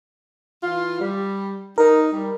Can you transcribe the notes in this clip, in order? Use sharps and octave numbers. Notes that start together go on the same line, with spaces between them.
E3 F4
G3
D#4 A#4
G3